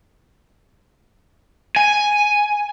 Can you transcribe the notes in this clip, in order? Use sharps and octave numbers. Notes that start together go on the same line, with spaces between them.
G#5